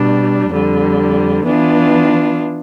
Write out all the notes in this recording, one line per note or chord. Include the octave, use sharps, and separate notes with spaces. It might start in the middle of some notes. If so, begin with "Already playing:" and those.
Already playing: B2 G3 D4
F2 D3 G3
E3 B3 D4 F4